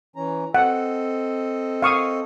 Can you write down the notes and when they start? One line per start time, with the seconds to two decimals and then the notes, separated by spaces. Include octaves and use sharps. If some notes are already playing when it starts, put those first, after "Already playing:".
0.16 E3 C#4 A#5
0.54 C4 A4 D#5 F#5
1.82 F5 C#6 D#6